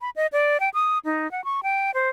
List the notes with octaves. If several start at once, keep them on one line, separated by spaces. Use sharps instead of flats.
B5
D#5
D5
G5
D#6
D#4
F#5
C#6
G5
C5